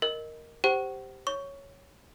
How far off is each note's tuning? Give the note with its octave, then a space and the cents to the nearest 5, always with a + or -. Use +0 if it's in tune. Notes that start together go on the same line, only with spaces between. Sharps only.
A#4 +0 D#5 +0
G4 +0 C5 +0 F#5 +40
C#5 +0 C#6 +15